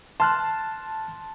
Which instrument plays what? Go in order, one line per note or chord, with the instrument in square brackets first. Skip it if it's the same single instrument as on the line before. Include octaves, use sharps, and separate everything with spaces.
[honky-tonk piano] A5 [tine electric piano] C6 F6 F#6